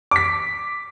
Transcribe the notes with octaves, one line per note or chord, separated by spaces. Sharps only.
D6 B6